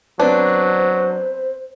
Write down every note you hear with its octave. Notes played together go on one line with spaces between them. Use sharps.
F#3 B3 C4 D4 B4 C5